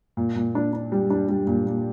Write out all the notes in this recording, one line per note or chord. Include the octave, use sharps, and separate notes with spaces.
A#2
A#2
D4
D4
G3
D4
G3
A#2
A#2